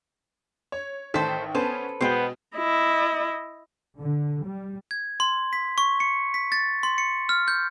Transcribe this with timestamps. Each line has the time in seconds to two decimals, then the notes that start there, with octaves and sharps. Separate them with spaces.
0.72 C#5
1.14 A1 D#3 A4 C5 B6
1.55 B3 C#4 A4 B4 C5
2.01 B2 G#3 B3 C5 G5
2.57 E4 D#5
4.00 D3
4.45 G3
4.91 G#6
5.20 C6
5.53 B6
5.78 C#6
6.00 C#7
6.34 B6
6.52 A6
6.83 C6
6.98 C#7
7.29 F6
7.48 G6